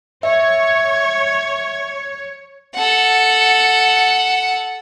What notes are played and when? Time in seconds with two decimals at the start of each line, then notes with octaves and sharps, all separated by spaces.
0.23 C#5 E5
2.74 A4 F#5